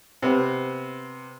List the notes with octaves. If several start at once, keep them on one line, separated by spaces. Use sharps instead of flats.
C3 B3 C4